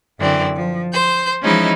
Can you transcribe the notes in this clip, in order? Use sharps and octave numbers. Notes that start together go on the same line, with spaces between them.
F#2 D3 E3 C4 D5
F3
C5 G6
E3 F3 G#3 C#4 D#4 E4